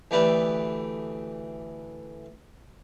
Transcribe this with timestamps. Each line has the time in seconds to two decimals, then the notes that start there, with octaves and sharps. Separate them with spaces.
0.11 D2 E3 A3 G4 B4 D5